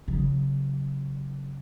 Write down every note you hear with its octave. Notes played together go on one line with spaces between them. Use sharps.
C#3 F#3